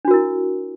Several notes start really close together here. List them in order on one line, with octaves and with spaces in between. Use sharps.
D4 F#4 A#4 E4